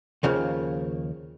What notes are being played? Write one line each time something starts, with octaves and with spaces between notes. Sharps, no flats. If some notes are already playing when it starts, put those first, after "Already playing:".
D#2 C#3 F3 A#3